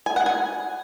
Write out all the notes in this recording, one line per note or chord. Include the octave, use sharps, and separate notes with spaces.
G#5
F#5
G#5